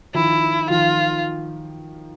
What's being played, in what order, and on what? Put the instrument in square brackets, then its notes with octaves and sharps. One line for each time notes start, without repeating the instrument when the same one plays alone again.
[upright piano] D#3 F3 [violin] E4
[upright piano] D#3 F3 [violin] F4